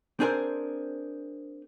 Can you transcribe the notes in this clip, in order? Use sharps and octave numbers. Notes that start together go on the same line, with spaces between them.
C4 D4 G#4 A#4 C5